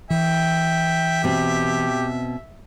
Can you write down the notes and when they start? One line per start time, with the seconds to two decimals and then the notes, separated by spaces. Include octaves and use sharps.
0.11 E3 E5 G5
1.24 B2 C4 G4